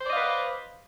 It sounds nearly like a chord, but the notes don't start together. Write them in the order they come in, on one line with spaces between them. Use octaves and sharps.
C5 D5 D#5 F5 B4